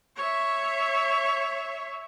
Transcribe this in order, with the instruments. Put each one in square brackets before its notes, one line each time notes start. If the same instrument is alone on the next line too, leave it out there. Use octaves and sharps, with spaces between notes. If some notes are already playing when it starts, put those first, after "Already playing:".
[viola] C#5 E5